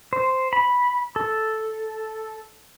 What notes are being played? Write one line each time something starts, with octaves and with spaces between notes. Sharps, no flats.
C5
B5
A4